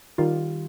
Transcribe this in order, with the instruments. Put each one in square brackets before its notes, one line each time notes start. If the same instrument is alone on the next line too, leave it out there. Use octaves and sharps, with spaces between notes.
[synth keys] D#3 G3 F4